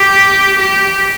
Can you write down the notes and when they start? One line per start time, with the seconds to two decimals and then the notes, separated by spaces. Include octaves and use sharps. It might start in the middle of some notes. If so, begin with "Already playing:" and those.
Already playing: G4
0.58 G4